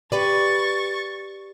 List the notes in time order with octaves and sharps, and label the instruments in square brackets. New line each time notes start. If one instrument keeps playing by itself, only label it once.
[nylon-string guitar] G4 B4 D5 [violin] C#6 A6